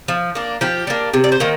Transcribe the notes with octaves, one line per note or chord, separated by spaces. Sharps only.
F3
A#3 D4
F3 G4
A#3 D4
C3
D5
C5
D#3 A#3